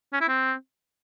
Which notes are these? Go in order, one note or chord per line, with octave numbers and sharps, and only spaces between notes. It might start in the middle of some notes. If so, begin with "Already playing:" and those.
C#4
E4
C4